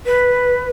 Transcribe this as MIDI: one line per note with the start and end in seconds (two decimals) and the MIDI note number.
0.06 0.69 71